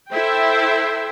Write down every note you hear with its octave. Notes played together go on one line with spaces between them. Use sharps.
E4 A4 C5 E5 G5